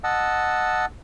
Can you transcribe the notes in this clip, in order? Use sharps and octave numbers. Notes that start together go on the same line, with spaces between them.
D#5 F#5 A5 E6